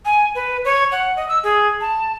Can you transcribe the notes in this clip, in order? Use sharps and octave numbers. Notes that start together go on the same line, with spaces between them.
G#5
B4
C#5
F#5
D#5
E6
G#4
A5